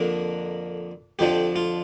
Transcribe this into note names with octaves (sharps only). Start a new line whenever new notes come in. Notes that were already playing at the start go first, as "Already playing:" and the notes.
Already playing: F2 D3 A#3 D4 A#4
F2 D3 F3 D4 G4
F4